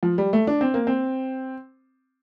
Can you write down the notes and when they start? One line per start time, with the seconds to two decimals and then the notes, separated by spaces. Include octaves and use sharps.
0.03 F3
0.18 G3
0.33 A3
0.47 D4
0.61 C4
0.74 A#3
0.87 C4